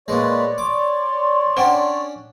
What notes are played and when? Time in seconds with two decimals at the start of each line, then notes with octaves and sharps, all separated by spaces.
0.08 A#2 G#3 B4 C#5 D5
0.58 C6 D6
1.57 C#4 D4 C5 F#5 G5